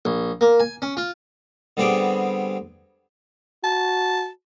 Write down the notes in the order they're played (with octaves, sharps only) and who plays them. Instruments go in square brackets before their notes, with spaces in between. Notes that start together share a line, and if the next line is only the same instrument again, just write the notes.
[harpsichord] A#1
A#3
G#5
C#4
F4
D3 G3 B3 C4 G#4 D6
[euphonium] F#4 [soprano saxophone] A5